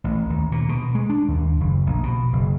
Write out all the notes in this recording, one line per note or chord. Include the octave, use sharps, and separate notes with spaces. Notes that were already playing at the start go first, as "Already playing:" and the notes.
A1
D#2
A#2
B2
G#3
D4
D#2
F#1
A#1
B2
F#1